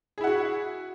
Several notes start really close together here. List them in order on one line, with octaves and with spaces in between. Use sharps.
G#4 E4 F#5 F#4